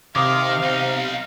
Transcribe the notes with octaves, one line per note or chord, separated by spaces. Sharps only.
C3 D#3 F5 D6 D#6
B1 D#4